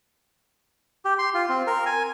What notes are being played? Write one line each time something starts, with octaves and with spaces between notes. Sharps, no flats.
G4
C6
F4
C4
A#4
G#5